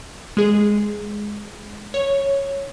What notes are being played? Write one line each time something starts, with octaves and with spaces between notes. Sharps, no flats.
G#3 G#4
C#5